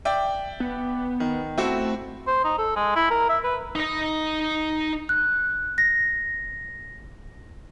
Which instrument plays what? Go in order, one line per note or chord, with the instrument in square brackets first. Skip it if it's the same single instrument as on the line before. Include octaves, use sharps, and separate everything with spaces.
[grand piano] D5 E5 G5
[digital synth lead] B3
[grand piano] D#3
[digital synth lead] A3 [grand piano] C4 E4 F#4
[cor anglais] C5
D#4
A4
G#3
E4
A#4
E5
B4
[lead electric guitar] D#4 D#5
[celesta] F#6
A#6